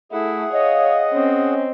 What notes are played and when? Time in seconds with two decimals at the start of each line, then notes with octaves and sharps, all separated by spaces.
0.12 A3 E4 G#4 F#5
0.53 C#5 D#5 F5
1.12 C4 C#4